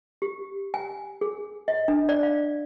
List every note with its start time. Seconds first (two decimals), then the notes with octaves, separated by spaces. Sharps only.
0.22 G4
0.74 G#5
1.21 G#4
1.68 D#5
1.88 D4
2.09 D5
2.23 F5